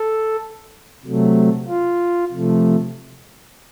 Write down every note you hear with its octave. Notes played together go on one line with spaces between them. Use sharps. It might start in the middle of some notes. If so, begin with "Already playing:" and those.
Already playing: A4
C3 F#3 A3
F4
C3 F3 A3